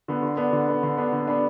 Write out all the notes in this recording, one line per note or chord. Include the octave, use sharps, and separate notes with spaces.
D3 B3
D3
B3 D4
D3
B3 D4
D3
B3 D4
D3
B3 D4